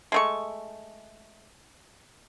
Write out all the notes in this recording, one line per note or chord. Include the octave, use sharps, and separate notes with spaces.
G#3 A3 C#6